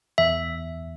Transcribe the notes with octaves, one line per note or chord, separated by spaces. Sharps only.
E2 E5